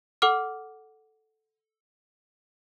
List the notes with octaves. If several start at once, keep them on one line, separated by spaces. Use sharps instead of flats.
A4 F#5 D6 F6